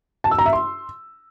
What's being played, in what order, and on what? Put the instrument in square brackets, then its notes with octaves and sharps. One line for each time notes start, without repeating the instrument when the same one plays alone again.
[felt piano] A5
E6
A#5
E5
C6